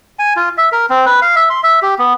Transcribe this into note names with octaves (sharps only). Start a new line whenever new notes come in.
G#5
F4
E5
A#4
C4
B4
F5
E5
C6
E5
G4
B3